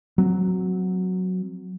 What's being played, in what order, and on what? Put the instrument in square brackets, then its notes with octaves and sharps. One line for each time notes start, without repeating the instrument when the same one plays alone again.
[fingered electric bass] F#3 C4